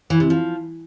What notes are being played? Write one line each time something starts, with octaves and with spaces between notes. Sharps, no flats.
E3
C3
F3